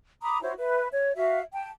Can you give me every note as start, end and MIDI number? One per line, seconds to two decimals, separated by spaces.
0.22 0.38 82
0.22 0.38 83
0.22 0.38 86
0.22 0.38 87
0.42 0.53 64
0.42 0.53 66
0.42 0.53 72
0.42 0.53 73
0.57 0.88 71
0.57 0.88 76
0.92 1.15 73
1.15 1.40 66
1.15 1.40 76
1.15 1.40 77
1.52 1.69 79
1.52 1.69 81